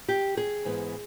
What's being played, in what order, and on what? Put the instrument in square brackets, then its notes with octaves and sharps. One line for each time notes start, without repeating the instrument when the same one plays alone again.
[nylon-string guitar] G4
G#4
G#2 E3 G#3 B3